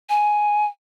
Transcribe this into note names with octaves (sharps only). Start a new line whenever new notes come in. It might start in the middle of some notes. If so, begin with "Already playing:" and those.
G#5